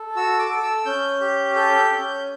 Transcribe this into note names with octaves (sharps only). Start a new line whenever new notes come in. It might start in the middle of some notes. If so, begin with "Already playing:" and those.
Already playing: A4
F#4 E6
D6
A4
E6
C#4 G6
G4
A4 G6
C#4